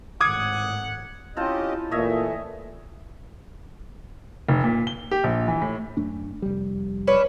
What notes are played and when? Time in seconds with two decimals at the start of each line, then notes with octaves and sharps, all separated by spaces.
0.21 G#1 A2 F#5 D6 D#6 G#6
1.37 C4 C#4 E4 F4 G4 D#5 A5
1.91 A#2 E3 A3 C#5 D#5 E5
4.49 F1
4.64 A#2
4.87 G7
5.11 G4
5.24 A#1
5.48 E3
5.62 A2
5.97 F#2 A3 D4
6.42 F1 G3
7.07 C#4 D4 B4